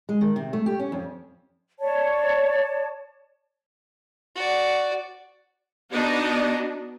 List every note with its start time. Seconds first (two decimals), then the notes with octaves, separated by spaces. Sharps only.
0.09 G#3
0.21 D#3
0.36 C3
0.53 A3
0.66 G4
0.80 C#4
0.92 F2
1.79 C#5 D5 A5
4.36 F#4 D5
5.92 B3 D4 D#4 F#4 D#5